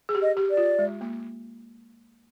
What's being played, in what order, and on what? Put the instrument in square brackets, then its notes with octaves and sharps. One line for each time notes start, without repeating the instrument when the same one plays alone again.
[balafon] G#4
G4
[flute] D#5
[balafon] G4
[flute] D5
[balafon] F4
G#3
A#3